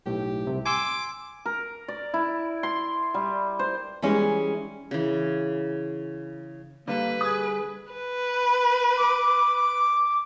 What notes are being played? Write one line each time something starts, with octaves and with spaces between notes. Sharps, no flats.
B1 A2 G4
C2 C3
G#5 C6 D6 E6
A#4
D5
E4
C6
G3
C5
E3 G3 G#3 C#4
C#3 E3
D3 G3 A#3 A4 B4
G#4 D#6 G#6
B4
D6